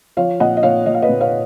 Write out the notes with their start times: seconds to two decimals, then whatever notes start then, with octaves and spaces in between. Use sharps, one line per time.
0.17 F3 C#5 F5
0.40 A#2 D#5 F#5
0.57 D#5
0.63 A#2 C#5 F5
0.86 A#2 D#5
0.94 F5
1.02 B4 D#5
1.09 A#2
1.21 C#5 F5